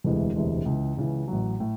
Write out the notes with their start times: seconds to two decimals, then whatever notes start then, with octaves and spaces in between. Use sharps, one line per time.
0.04 E1 D2 C3 E3 G#3
0.36 E1 D2 C3 E3 G#3
0.66 C#2 C#3 E3
0.97 C#2 C#3 E3
1.28 A1 A2 F#3
1.60 A2